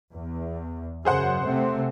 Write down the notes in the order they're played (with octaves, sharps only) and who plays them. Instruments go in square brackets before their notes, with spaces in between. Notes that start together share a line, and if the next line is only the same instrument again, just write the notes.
[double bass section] E2
[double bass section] F#2 C#3 [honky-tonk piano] G#4 C5 F#5
[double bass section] C3 A3 C4